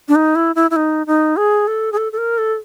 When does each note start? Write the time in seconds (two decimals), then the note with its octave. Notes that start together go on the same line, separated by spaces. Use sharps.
0.08 D4
0.15 D#4
0.36 E4
0.55 E4
0.71 E4
0.76 D#4
1.07 D#4
1.37 G#4
1.67 A4
1.92 G#4
1.97 A4
2.12 A4
2.18 A#4
2.38 A4